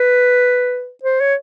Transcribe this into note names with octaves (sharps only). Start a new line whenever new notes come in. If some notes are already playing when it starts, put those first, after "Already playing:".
Already playing: B4
C5
C#5